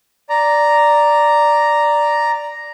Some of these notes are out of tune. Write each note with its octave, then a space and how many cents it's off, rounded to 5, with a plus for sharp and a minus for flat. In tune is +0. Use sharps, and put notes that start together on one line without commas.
D5 +0 A#5 +0